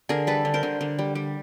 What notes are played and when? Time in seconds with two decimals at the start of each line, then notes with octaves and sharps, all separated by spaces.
0.09 D3 G#4 A#4
0.27 G3 A4 B4
0.45 D3
0.54 A#4 C5
0.63 D3
0.81 D3
0.99 G3
1.15 G3